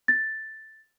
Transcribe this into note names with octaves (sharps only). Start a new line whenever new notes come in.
A6